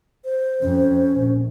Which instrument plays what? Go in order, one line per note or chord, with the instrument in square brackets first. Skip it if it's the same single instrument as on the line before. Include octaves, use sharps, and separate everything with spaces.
[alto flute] C5
[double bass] F2 [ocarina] C#4
[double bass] A#1